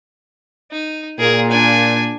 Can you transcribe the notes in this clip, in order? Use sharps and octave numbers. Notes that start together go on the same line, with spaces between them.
D#4
A#2 G#4 A#4
D4 G#5